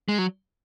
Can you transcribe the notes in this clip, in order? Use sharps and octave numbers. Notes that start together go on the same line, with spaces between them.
G#3
F#3